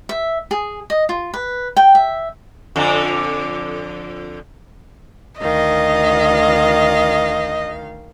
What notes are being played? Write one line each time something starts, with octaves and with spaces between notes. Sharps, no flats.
E5
G#4
D#5
F4
B4
G5
E5
F2 D3
D2 D#3 D#5 F5